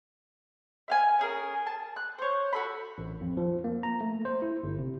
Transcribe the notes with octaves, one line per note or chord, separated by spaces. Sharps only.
E5 F5 G#5
C#4 G#4 A#4
A5
F#6
C5 C#5
F#4 A4 B5
A1
F2
F3
A#3
A#5
A3
C5
E4
G1
C3